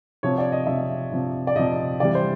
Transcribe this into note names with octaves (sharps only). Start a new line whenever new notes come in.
C3 F3 C#5
D5
D#5
C3 F3 E5
C3 F3
D5
C3 F3 D#5
C3 E3 G3 D5
C5